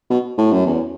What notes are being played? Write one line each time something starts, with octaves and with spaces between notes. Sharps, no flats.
B2
A2
F#2
E2